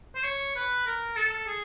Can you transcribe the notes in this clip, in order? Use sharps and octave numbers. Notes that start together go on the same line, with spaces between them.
C5
C#5
B4
A#4
A4
G#4